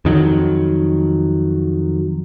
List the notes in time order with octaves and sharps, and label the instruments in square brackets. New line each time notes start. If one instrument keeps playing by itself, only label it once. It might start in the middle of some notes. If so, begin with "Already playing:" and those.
[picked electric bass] F2 D#3 F#3